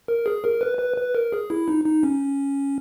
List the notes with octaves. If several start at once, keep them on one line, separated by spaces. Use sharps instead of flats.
A#4
G#4
A#4
B4
B4
B4
A#4
G#4
E4
D#4
D#4
C#4